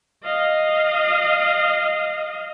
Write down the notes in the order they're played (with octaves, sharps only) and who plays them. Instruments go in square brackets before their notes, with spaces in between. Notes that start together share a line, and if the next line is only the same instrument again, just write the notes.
[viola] D#5 F5